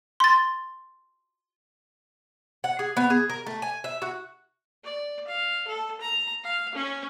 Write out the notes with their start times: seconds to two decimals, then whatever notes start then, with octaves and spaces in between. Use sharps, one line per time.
0.20 C6 A6
2.64 F#5
2.79 G#4
2.97 B3
3.10 G#4
3.30 A#4
3.46 A3
3.62 G#5
3.84 E5
4.02 F#4
4.84 D5
5.27 F5
5.68 A4
6.01 A#5
6.44 F5
6.75 C#4